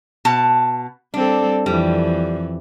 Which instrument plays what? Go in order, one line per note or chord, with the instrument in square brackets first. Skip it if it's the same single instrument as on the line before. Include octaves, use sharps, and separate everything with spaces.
[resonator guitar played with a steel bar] B2 A5
[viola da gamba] G3 C4 A4 [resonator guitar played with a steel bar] D4
[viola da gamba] F2 E3 [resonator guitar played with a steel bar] G3